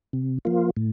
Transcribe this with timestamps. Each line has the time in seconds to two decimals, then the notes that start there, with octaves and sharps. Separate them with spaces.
0.13 C3
0.45 F3 A#3 F4
0.77 A2